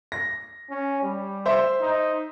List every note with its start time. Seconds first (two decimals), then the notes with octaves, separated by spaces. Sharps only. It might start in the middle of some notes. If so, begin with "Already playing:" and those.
0.12 A#6
0.70 C#4
1.03 G3
1.46 C5 E5
1.81 D#4